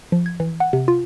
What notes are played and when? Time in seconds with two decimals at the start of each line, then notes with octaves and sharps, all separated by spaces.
0.12 F3
0.26 G#6
0.40 E3
0.60 F#5
0.73 C3
0.88 F4